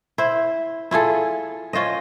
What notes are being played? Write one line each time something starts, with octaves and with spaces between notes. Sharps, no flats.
E4 C5
E4 F4 G#4 A4
C#4 F4 C5 D#5